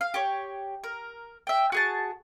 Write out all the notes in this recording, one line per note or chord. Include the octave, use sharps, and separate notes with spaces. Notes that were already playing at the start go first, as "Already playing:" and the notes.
F5
G4 C#5
A#4
E5 G5
F#4 G#4 A5